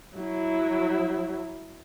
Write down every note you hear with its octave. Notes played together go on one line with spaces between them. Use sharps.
F#3 E4